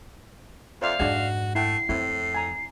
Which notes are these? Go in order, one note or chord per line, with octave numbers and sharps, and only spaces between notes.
F2 C5 D5 E5 F5
F2 G#2 G#3 D4 F#4
A3 E4 F#5 G5 C7
F2 A2 C4 E4
G#5 A#5